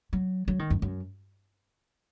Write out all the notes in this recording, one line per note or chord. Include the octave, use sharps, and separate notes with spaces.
F#3
F#3
D#3
F#2
F#2